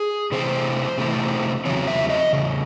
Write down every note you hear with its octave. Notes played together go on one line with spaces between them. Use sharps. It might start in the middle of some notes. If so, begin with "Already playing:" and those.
Already playing: G#4
C3 E3 A3 C4 C5
C3 E3 A3 C4
E2 C#3 F#3 C4 C#5
E5
D#5
E2 C#3